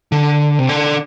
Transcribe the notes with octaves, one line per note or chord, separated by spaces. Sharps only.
D3
C3
D3